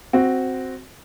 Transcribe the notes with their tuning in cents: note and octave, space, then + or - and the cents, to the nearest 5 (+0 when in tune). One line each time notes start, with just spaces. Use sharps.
C4 +0 F#4 +0